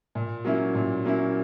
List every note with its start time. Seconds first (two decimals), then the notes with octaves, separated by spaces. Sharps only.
0.15 A#2
0.45 F#3 A#3 C#4 E4
0.75 A#2
1.05 F#3 A#3 C#4 E4